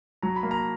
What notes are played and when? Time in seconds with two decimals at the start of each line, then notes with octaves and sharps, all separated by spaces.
0.22 F#3 A#5
0.36 B5
0.43 A#3
0.51 A#5